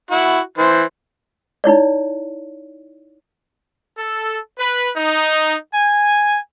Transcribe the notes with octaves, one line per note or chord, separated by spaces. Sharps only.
E4 F#4
E3 C5
D#4 E4 C#5 D5
A4
B4
D#4
G#5